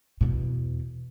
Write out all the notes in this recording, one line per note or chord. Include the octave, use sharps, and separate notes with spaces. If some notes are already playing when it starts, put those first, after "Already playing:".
E2 B2